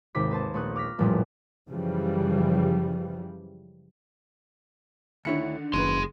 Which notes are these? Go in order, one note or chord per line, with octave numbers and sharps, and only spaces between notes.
G#1 D#2 C3 D6 B6
B4 C5 A5
A#1 A3 C#6 D#6 F#6
D6 F6 A#6 B6
E1 A1 F#2 A#2 F3 G3
F#2 C#3 E3 F3 G3
D2 D3 D#3 E4 C#5 C#7
F#1 D#2 C#3 G#4 B4 C6